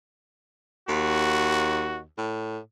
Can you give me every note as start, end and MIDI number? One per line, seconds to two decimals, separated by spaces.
0.88 2.05 39
0.88 2.00 66
2.18 2.59 45